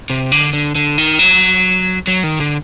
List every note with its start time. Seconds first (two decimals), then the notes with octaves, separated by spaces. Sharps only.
0.10 C3
0.32 D3
0.53 D3
0.75 D3
0.98 D#3
1.19 F#3
2.07 F#3
2.23 D#3
2.40 D3